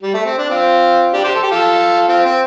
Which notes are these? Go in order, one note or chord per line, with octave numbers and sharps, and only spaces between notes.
G3
A3
C4
D4
C4 F4
D4 G4
G4 C5
A4
G4
F4 A4
C4 F4
C4